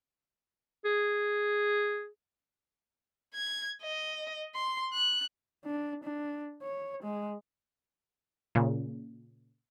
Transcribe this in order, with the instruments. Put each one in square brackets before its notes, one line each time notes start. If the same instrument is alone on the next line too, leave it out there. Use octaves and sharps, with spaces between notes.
[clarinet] G#4
[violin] G#6
D#5
C6
F#6
[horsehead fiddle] D4
D4
C#5
G#3
[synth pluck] A#2 C#3